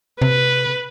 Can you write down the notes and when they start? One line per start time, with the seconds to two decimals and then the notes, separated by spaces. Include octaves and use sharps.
0.22 C3 B4